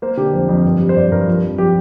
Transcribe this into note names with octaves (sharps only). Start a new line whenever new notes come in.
A#3 C5
D3 G4
F2 C5
F2
G2
G3
C5
G2 D5
G2 A#4
F3
F2
F3 G4